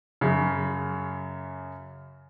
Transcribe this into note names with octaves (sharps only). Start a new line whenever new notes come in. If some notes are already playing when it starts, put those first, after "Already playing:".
F#2 C#3